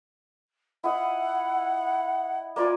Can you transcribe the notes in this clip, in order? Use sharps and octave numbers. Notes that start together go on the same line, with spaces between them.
E4 D#5 F#5
A#3 F4 D5 G#5